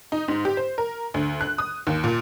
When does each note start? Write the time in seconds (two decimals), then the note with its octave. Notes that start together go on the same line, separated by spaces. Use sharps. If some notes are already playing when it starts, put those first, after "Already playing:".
0.12 D#4
0.28 G#2
0.45 G4
0.57 C5
0.78 A#4
1.14 D2
1.41 F#6
1.58 D#6
1.87 D#2
2.04 A#2